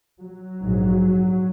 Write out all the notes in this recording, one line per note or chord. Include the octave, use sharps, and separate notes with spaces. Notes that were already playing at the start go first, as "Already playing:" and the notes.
F#3
A#1 G#2